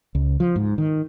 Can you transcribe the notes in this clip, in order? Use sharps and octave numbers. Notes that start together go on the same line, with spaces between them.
C#2
F3
G#2
D#3